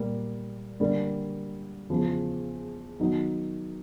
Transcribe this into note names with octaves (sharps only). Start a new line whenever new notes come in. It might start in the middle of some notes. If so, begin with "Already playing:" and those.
Already playing: A#2 G3 A#3
D3 G3 A#3
E2 C#3 F3
D#3 F#3 B3 D#4